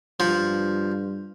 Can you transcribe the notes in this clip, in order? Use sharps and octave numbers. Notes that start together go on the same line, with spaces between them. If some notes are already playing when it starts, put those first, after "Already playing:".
G2 F3